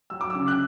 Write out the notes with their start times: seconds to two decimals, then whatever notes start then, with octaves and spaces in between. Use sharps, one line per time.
0.10 F#3 E6
0.21 D6
0.30 E6
0.35 C#3
0.48 F#6